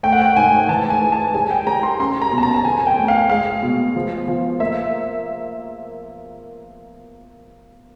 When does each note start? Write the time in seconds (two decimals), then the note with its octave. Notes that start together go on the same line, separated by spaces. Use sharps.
0.03 A3 G5
0.13 F#5
0.22 G5
0.36 G#2 G#5
0.69 E3 A5
0.90 G#5
1.02 G#3
1.12 A5
1.34 G3 G#5
1.51 G5
1.67 G3 A#5
1.83 C6
1.99 C#4 C6
2.22 A#5
2.32 B2
2.38 A5
2.43 A#5
2.54 A5
2.65 F2 G#5
2.87 G5
2.98 A3
3.08 F5
3.30 G#3 F5
3.63 B2
3.96 F3
4.28 F3
4.60 A#3 E5